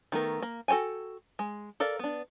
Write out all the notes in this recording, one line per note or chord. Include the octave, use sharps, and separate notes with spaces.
D#3 A3 B3 A#4
A#3
F#4 A4 C#5 G5 G#5
G#3
A4 A#4 D5 F5
B3 D4